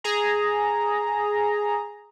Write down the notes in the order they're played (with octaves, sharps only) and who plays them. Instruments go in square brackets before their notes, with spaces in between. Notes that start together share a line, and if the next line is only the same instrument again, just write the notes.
[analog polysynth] G#4 A#5